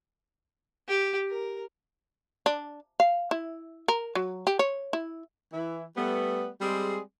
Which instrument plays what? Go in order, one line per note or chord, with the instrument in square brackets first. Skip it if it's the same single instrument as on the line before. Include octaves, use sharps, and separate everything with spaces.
[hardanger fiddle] G4
A#4
[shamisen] D4
F5
E4
A#4
F#3
G4
C#5
E4
[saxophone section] E3 E4
G3 A3 B3
G3 G#3 C4 G#4